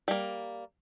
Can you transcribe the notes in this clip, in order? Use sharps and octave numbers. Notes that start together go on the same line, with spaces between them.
G3 A#3